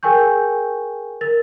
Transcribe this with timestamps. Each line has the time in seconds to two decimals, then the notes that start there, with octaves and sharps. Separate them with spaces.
0.03 G#4 A#4 G5 G#5 C#6 G6
1.21 A#4 A6